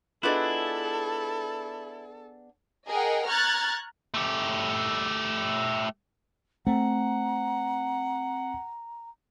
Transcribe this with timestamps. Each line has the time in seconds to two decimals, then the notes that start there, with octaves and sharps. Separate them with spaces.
0.23 B3 D4 E4 F4 G#4 A4 B4 D#5
2.87 G#4 A#4 D#5 F#5 G5
3.26 A#5 C#6 F6 F#6 G#6 A6
4.14 A3 G4
6.67 A3 C4 F#5 A#5